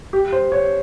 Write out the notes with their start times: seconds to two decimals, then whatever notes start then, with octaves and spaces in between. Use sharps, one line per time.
0.13 G4
0.33 C5
0.52 C#5